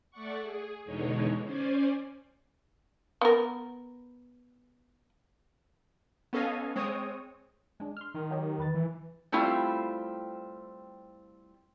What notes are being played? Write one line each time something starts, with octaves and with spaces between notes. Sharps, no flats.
A3 D5 F#5 C#6
G#4
E2 B2 D3 G#3 D#4 C#5
C#4 C5 D5 G#5
B3 A#4
B3 C#4 A4 D#5 F5 G#5
G#3 C4 C#5 D#6
G#3 D4
C6 F6
D#3
F#3 D#4 G4
E2 B4 A6
E3
G3 A3 C4 E4 F4